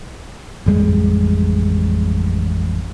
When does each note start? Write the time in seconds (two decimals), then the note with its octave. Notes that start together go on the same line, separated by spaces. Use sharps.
0.66 A1 F2 G3 G#3